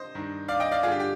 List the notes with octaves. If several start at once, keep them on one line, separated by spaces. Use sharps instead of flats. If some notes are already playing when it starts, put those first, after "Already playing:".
Already playing: C5 D#5
G2 D#3
D5 F5
D#5 G5
D5 F5
G2 D3 F4 G4 G#4
G4